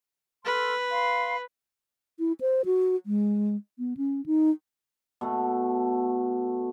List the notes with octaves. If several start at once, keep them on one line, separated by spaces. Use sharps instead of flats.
A4 B4 C6 F6
F5 B5 C6
E4
C5
F#4
G#3
B3
C#4
D#4
B2 A3